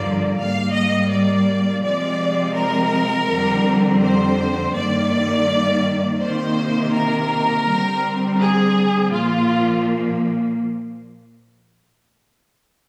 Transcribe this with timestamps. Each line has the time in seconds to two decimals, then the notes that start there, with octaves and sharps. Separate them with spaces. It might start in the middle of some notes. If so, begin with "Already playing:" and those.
Already playing: G2 D3 F3 A#3 D5
0.37 G#2 G3 A#3 F5
0.74 D#5
1.10 D5
1.83 C3 F3 G#3 C4 D5
2.56 A#4
3.28 F2 D3 G3 C4
4.02 C5
4.75 G2 D#3 A#3 D5
6.20 C3 D#3 A#3 C5
6.93 A#4
7.66 D3 G3 C4
8.39 G#4
9.12 A#2 F3 A#3 F4